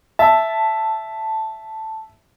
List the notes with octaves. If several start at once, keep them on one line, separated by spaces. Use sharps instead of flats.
E5 A5